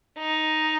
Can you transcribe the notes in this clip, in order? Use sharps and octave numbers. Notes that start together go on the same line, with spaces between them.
D#4